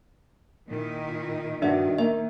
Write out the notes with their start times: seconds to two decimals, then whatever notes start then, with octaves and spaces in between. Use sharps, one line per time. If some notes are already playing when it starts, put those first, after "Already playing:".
0.67 A#2 D#3 E4
1.62 G2 D#3 D4 F#4 D5 E5
1.99 A#3 E5